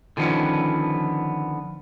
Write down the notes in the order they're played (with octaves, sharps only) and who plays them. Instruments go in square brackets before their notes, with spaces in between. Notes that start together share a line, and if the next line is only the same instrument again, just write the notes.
[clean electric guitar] D3 D#3 F3 B3 C#4